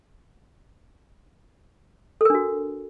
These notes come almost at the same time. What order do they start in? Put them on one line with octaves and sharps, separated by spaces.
A4 A#4 D4 F#4